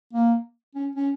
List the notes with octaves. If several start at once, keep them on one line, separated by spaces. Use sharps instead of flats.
A#3
C#4
C#4